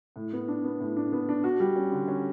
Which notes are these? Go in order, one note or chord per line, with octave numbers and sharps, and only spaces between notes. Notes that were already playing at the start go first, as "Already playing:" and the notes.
A2
B3
D4
B3
A2
D4
B3
D4
F#4
G3
C#4
D3
C#4